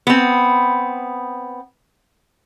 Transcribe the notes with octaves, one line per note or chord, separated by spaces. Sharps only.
B3 C4